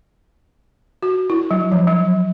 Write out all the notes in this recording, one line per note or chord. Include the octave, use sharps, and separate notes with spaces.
F#4
E4
F#3
F3
F#3